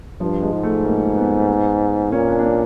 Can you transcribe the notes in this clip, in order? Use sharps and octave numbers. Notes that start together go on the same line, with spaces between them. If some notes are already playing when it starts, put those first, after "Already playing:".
G2 F3
G#3
G#2
A3
A#3
B3
A#2 C#4
D4
D4
C#4